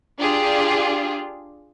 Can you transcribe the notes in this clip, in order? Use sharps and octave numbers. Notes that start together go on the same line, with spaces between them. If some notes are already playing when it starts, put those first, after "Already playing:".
D4 F4 G4 G#4